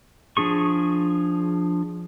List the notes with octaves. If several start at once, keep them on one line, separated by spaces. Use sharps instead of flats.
F3 D4 G#4 C#6